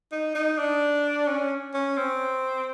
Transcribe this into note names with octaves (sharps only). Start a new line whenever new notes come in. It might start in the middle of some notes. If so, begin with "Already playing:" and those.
D#4
D#4
D4
C#4
C#4
C4